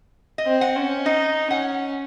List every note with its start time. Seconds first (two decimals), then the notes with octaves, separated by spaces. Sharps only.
0.38 D#5
0.46 C4
0.61 F#5
0.76 C#4
1.05 D#4 D#5
1.51 C#4 F#5